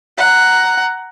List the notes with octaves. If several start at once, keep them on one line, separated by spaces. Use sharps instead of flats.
F#5 A#5